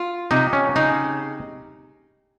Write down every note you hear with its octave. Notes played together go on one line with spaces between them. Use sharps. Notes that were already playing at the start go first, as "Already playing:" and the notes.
Already playing: F4
C3 D#4
C#4
C#3 D#4